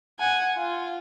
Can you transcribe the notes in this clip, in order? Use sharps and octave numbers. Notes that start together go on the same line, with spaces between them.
F#5 G#5
F4